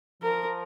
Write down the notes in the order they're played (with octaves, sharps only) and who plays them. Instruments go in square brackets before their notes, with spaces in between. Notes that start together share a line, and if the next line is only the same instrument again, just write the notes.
[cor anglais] F3 [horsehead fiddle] A#4